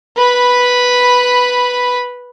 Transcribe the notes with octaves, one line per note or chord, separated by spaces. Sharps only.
B4 B5